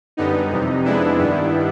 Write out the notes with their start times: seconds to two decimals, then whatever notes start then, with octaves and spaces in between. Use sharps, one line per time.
0.17 F#2 D3 G3 B3 D#4
0.51 F2 C3 E3 G3
0.85 F2 C3 E3 G#3 B3 D4 E4
1.19 G2 D#3 G3 B3